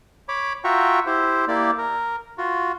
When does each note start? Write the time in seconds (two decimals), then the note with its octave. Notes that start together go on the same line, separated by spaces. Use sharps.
0.29 C#5 B5 D6
0.64 F4 F#4 E5 G5 A#5 C#6
1.06 E4 G4 C5
1.48 A#3 E4 G4 D5
1.78 A#4
2.38 F4 F#4